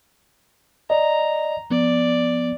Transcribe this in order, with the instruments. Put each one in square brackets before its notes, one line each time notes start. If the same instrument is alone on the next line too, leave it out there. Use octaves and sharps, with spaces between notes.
[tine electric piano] D5 D#5 [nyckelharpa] A#5
[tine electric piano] F3 B3 [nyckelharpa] D5